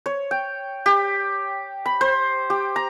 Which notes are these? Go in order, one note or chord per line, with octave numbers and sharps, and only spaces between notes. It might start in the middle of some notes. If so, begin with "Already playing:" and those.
C#5
G5
G4
B5
C5
G4
A#5